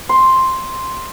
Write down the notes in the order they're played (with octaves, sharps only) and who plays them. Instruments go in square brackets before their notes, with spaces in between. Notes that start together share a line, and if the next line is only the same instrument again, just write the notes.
[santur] C6